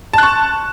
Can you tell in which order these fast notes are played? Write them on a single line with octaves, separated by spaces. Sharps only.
A5 F#6 C#6